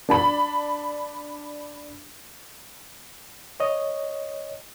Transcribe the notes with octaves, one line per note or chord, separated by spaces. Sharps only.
D4 A5 B5
C#5 D#5